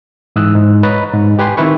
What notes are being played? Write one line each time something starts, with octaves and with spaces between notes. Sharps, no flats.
G#2 E3 D#6 E6 F#6
G#2
B4 C#5 D#5 A#5 A6
G#2
G4 B4 G#5 C6
D#3 C4 E4 B4 C#6